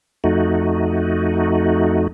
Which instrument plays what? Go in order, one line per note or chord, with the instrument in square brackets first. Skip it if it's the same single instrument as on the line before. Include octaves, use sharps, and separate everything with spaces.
[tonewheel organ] F2 A3 D#4 F#4